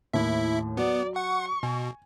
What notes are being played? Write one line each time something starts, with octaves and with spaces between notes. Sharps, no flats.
D#2 A2 E4 E5
F#3 B3 D5
F#5 C#6
B2 G#5